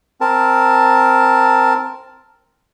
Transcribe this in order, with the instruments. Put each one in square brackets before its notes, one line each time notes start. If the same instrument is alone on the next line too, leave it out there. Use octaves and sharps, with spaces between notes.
[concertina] C4 A#4 A5